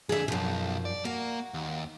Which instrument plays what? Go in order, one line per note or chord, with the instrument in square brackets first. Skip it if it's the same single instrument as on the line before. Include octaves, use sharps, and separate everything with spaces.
[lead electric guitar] F2 D3 [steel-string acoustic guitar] G#4 E5
[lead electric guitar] B1 [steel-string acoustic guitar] F#2 F3
[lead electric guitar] D5
[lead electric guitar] A#3 [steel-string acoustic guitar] F#4
[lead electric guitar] D#2